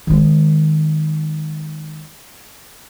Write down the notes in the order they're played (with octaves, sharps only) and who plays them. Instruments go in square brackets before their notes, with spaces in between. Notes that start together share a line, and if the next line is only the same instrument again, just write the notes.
[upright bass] D#3 G#3